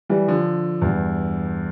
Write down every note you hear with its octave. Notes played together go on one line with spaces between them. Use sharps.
E3 G3
D3 F3
E2 G2